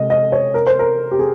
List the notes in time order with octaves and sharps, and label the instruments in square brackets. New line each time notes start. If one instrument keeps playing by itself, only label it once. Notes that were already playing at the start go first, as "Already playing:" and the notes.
Already playing: [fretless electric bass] C3 G#3 [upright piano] D#5
[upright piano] D#5
C#5
A#4
C5
A#4
G4
G#4